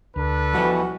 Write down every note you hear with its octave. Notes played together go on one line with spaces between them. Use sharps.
D2 D4 A4 B4
B2 E3 F3 G3 F#4